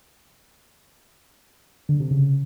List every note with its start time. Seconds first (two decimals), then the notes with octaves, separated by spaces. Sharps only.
1.89 D3
2.00 C3
2.11 C#3